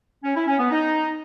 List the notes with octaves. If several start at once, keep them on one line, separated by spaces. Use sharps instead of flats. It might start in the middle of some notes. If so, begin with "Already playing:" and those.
C#4
E4
C#4
B3
D#4